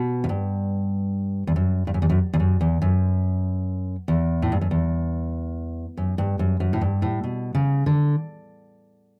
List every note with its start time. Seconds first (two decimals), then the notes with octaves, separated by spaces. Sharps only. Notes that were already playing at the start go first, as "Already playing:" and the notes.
Already playing: B2
0.24 F#2
0.29 G2
1.47 E2
1.56 F#2
1.87 G2
1.94 F#2
2.02 E2
2.09 F#2
2.33 E2
2.40 F#2
2.61 E2
2.82 F#2
4.08 E2
4.42 A2
4.52 G2
4.61 F#2
4.71 E2
5.97 F#2
6.18 G2
6.39 F#2
6.60 F#2
6.73 A2
6.81 G2
7.02 A2
7.24 B2
7.55 C#3
7.86 D3